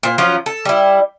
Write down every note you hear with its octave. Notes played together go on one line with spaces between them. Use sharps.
A#2 C5
F3 F#3 C#4 F4
A4
G3 E4